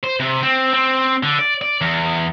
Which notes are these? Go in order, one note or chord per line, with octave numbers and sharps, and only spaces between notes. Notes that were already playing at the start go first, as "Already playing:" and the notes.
C5
C3
C4
C4
D3
D5
D5
E2